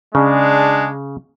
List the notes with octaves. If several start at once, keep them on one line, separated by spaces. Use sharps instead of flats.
C#3 G#3 D4